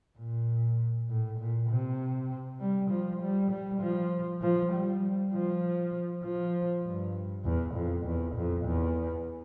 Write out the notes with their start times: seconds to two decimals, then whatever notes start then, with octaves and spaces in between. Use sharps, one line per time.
0.18 A#2
1.10 A2
1.39 A#2
1.70 C3
2.60 G3
2.90 F3
3.22 G3
3.51 G3
3.81 F3
4.42 F3
4.72 G3
5.32 F3
6.24 F3
6.84 G2
7.45 E2
7.75 F2
8.06 E2
8.35 F2
8.65 E2